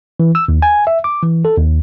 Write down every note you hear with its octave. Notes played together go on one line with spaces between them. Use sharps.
E3
E6
D#2
G#5
E5
D6
E3
A4
D#2